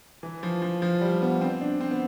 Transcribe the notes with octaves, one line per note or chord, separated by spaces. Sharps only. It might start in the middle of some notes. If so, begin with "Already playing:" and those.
E3
F3
F3
F3
G3
B3
C4
D4
C4
B3